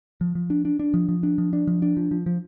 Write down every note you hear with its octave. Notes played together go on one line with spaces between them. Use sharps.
F3
F3
D4
D4
D4
F3
F3
D4
F3
D4
F3
D4
F3
F3
F3